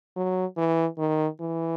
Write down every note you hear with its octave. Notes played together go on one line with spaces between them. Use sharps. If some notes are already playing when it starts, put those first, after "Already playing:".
F#3
E3
D#3
E3